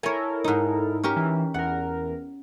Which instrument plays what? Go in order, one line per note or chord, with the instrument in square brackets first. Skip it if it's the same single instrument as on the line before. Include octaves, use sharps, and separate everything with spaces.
[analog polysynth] E4 A4 A#4 [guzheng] C#5 G#5
[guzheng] G#2 D#4
C#4 G4 A#4
[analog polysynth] E3
[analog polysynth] E2 A#4 [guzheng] F#5